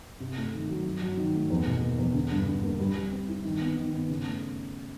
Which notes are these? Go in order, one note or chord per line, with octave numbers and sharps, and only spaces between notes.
C3
A3
D#3
F#3
F#3
F#3
D#3
A3
E2
B2
A#3
E2
D3
G2
D3
A#3
G3
G3
C4
E4
D#3
B3
D#3
B3
C#3
A3